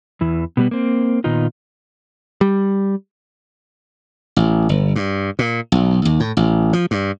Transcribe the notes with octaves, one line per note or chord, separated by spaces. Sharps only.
E2 E3
B2 G3 B3
A#3 C4
A#2 D#3 B3 D#4 F4
G3
A1
G1
G2
A#2
B1
D#2
A2
A1
F3
G2